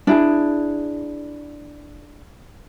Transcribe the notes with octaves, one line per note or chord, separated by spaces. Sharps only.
D4 E4 G#4